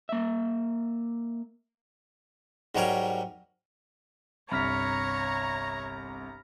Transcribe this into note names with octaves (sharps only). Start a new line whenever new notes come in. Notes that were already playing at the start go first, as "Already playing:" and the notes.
A#3 E5
G#2 F#3 G3 A#4 C#5 G#5
G1 C2 C#5 A#5 B5 F6 B6